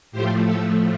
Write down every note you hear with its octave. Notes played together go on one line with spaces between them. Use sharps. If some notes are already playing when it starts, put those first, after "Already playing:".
A2 F3 A3 G4 C5
A4